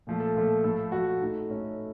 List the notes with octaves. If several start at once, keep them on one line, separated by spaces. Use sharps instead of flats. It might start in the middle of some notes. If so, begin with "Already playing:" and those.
A#2 F3 A3
A4
A#2 F3 A3
A2 F3 A3 A4
A2 F3 A3 F#4
A2 A3 D#4
A2 A3 C#4